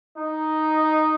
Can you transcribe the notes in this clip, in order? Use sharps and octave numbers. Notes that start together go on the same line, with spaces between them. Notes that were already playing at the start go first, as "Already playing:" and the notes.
D#4